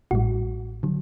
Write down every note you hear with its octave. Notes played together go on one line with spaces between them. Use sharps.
A1 A2 G3 F#4
D3 F#3